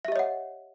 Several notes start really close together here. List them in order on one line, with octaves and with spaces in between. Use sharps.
E5 G4 D#5 C#5 F#5